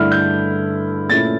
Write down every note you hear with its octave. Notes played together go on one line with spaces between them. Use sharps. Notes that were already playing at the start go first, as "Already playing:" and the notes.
Already playing: G2 D3 A3 E4 F6
G6
A#2 A3 C#4 E4 A6